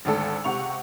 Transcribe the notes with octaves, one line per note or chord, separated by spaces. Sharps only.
G#1 D2 A4 E6
C#2 C3 F#5 C#6 F7